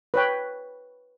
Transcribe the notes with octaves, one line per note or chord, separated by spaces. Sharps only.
B4 C#5 G5